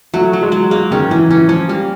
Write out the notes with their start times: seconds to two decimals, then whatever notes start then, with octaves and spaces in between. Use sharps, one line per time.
0.14 F#3 A3
0.33 F#3
0.43 G#3
0.52 F#3
0.71 G#3 A#3
0.91 D#3 C#4
1.11 E3 C#4
1.30 E3 C#4
1.49 F3 C#4
1.69 G3 A#3